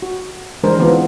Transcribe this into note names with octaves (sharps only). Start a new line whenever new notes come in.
F#4
E3 G#3 D4 G#4 A#4 C5
D#3 E3 B3 C4 D4 F4